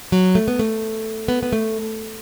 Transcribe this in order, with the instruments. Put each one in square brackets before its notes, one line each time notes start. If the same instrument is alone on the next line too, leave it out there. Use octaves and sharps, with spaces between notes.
[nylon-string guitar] F#3
A3
B3
A3
B3
B3
A3